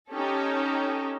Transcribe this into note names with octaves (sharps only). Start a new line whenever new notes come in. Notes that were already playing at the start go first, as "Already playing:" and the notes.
C#4 D#4 G4 A4